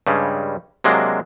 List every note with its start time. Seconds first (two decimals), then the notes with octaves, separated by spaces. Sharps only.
0.07 G2 C#3 G3 G#3
0.84 C3 F#3 G#3 A#3 D4